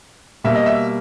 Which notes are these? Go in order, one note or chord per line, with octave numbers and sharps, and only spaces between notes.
B2 G3 A#3 E5
D#5
E5